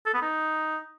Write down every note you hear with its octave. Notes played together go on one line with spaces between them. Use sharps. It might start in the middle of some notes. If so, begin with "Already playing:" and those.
A4
B3
D#4